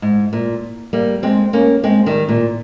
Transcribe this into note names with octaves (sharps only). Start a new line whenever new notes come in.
G#2
A#2
G3 A#3
G#3 C4
A#3 C#4
G#3 C4
D#3 G3
A#2